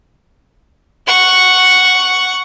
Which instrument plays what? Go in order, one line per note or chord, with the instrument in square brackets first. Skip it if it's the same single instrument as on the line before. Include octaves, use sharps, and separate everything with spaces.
[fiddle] F#5 C#6